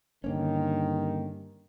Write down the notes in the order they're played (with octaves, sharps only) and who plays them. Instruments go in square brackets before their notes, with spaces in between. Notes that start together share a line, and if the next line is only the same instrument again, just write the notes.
[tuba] G2 [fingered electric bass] D3 A#3 C#4 [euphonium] D#3